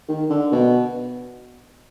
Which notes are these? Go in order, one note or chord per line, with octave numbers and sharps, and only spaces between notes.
D#3
D3
B2